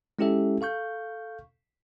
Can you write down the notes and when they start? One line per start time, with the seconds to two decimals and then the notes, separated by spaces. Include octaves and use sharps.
0.19 G#3 C#4 E4 G4 A4 E5
0.61 A4 F5 C#6 G6